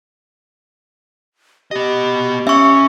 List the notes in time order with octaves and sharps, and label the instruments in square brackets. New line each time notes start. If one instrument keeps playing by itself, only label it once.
[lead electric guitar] B3 D#5 [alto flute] G4
[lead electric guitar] C#4 [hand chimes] E5 C#6